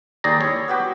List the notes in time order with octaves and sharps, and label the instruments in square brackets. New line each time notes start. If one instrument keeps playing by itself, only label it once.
[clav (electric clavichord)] D#2 D5 A#5 [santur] G#4 G5
[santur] E4 [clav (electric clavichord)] C#5
[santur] B3 F#4 G4